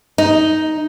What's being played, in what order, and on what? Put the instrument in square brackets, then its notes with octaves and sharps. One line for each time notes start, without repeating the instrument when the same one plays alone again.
[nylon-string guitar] D#4